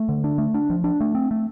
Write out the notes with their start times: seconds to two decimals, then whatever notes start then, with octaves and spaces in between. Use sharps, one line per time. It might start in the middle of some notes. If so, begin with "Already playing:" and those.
Already playing: A3
0.09 D3
0.24 D4
0.38 A3
0.54 D4
0.70 F3
0.84 D4
1.00 A3
1.15 C4
1.31 A3